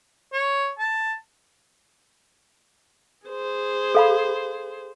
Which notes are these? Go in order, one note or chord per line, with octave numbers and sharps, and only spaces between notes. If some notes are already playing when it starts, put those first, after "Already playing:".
C#5
A5
G#4 C5
A4 F5 B5